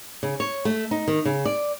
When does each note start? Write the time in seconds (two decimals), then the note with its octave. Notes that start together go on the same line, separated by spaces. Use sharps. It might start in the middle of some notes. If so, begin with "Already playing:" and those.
0.23 C#3
0.40 C#5
0.65 A3
0.91 D#4
1.08 D#3
1.25 C#3
1.45 D5